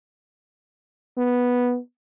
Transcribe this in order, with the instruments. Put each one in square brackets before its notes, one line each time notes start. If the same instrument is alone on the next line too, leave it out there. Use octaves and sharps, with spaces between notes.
[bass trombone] B3